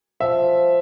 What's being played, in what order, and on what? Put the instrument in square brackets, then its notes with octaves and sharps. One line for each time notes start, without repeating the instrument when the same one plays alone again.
[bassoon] F3 [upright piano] E5